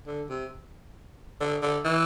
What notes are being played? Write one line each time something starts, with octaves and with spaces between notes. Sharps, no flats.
D3
C3
D3
D3
E3